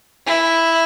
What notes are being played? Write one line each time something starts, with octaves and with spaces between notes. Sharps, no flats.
E4